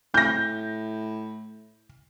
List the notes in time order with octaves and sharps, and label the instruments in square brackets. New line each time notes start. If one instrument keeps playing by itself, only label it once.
[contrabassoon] A2 [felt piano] G6 A#6